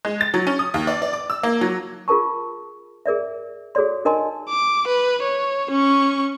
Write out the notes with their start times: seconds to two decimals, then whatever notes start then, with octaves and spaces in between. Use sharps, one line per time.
0.05 G#3
0.21 A6
0.34 F#3
0.47 C#4
0.59 D#6
0.74 D#2
0.87 D5
1.02 D5
1.13 D6
1.30 E6
1.43 A#3
1.61 F#3
2.08 F4 G#4 A#4 A5 C#6
3.06 G#4 A#4 D5 E5
3.75 F#4 G#4 A4 C#5 D5 C6
4.05 D#4 A#4 D#5 G#5 A5 C6
4.49 D6
4.87 B4
5.22 C#5
5.71 C#4 C#6